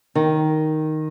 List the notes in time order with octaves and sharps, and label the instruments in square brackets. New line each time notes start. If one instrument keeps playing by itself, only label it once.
[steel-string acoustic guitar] D#3